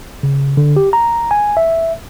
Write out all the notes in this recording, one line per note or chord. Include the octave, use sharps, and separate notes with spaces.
C#3
D3
G4
A#5
G#5
E5